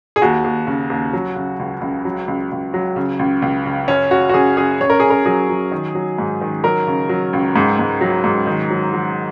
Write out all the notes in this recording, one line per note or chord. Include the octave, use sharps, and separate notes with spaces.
G#4
D#2 F#4
D#2
C#3
D#2
F#3
C#3
C#2
C#2
F#3
C#2
C#2
F#3
C#3
C#2
C#2
C#3
F#2 C#4
C#3 F#4
F#4
F#2 G#4
F#2 G#4
F#2 C#5
A#4
F#2 G#4
A#4
F#3 G#4
F#3
D#3
F#3
G#2
D#3
F#3 A#4
C#3
F#3
C#2
G#2
G#2
F#3
G#2
D#3
F#3
F#3